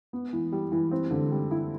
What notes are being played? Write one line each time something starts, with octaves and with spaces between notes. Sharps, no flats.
B3
E3
G3
E3
C4
D3
G3
E4